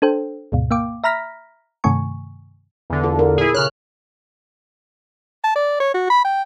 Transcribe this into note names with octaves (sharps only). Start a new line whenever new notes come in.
D4 A4 C5 G5
D2 G#2 B2
A#3 F5 G5 D6
E5 A#5 B5 F6 A#6 B6
G2 C3 D#3 A3 G#5 C#6
E2 D3
F4 A4
A#4
A#2 E4 G#4
C#3 C#5 F6 F#6
A5
D5
C#5
F#4
B5
G5